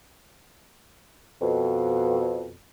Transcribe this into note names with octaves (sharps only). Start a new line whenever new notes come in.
F2 B2